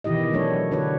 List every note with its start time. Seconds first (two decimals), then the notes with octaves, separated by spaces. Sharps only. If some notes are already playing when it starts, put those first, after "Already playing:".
0.04 B2 D#3 E3 E4 G4 D#5
0.33 F#3 A3 D4 C#5
0.71 D3 D4 F#4 B4 C#5